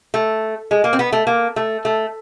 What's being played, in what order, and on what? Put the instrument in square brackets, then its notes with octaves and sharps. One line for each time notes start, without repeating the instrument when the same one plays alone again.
[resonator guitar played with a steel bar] A3
G#3
A#3
C4
B3
A3
A#3
A3
A3